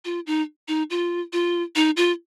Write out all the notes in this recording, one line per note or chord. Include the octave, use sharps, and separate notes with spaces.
F4
D#4
D#4
F4
F4
D#4
F4